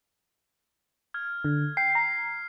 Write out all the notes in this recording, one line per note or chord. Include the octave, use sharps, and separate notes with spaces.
F6 G#6
D3
G5 C7
A#5